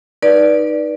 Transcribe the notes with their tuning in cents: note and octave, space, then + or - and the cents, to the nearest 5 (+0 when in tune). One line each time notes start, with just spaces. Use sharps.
D#4 +0 B4 -25 D5 +0